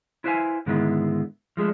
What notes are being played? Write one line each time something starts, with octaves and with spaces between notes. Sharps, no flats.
E4 B4 C5 E5 F5 G#5
G#2 D3 D#3 G#3 B3 E4
F3 G#3 A3 D4